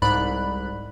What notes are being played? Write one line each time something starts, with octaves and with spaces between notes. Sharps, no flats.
C2 G#2 D5 B5 F#6